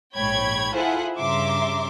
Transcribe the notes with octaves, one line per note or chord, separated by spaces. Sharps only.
A#1 G#2 C#5 G5 B5 G#6
E4 F4 G#4 A4 C5 F#5
G2 C#3 E5 A#5 C6 D6